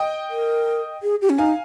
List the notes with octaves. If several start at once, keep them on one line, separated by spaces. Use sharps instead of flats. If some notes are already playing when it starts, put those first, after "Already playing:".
Already playing: D#5 G5
A#4
G#4
G4
C#4
D#4 F5 G#5